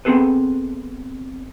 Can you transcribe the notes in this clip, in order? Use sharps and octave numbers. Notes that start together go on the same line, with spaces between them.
B3 C4 D#4 G#4 A4 B4